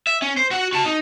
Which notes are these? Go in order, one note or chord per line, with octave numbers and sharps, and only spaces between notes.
E5
C#4
C5
F#4 F#5
F#4 A5
D#4